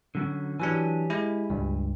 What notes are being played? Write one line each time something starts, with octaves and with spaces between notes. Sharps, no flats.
D3 F#3 C#4
E3 F#3 D4 G4 G#5
G#3 E4
C#2 G2